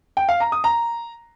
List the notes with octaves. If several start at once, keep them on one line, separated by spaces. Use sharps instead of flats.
G5
F5
A#5
D#6
A#5